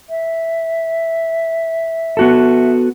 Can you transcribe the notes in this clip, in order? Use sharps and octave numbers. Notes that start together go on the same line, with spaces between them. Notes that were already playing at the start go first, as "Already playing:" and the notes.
E5
B3 F#4 A4